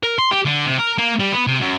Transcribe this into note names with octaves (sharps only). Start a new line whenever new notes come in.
A#4
C6
G4
D3
C3
A#4
A#3
G3
B3
C3
F#2